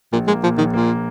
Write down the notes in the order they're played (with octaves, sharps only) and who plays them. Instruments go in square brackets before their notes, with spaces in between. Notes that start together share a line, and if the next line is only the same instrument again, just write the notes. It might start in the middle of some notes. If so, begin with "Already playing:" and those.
[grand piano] A#1 [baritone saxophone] A#2
[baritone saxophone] G#3 [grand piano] A#3
[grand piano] A#2 [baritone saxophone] F3
[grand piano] A#1 [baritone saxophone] D#3
[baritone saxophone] A#2 [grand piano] A#3